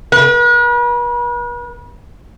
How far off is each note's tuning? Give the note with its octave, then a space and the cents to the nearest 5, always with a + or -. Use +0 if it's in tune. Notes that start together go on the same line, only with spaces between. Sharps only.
B4 -45